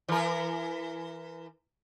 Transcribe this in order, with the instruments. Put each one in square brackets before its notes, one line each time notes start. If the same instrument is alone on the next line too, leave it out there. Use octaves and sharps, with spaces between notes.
[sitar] E3 A#4